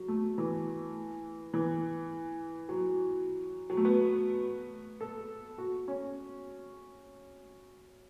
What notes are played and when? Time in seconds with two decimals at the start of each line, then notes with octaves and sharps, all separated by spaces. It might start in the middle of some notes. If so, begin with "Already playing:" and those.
Already playing: F#3
0.08 A3
0.38 E3
1.54 E3
2.69 F#3
3.70 F#3
3.77 A3
3.85 B3
5.01 A4
5.58 F#4
5.88 C#4